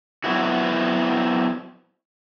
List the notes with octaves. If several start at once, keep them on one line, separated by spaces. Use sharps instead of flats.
F#3 B3 C4 E4 F#4